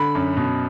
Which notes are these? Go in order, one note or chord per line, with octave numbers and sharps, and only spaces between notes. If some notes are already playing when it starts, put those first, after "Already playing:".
Already playing: D3 B5
F#2
B2